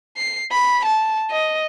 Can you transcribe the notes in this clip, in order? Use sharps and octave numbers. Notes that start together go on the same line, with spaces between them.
C7
B5
A5
D#5